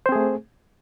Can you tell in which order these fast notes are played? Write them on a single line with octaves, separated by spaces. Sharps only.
C5 C4 G#4 A3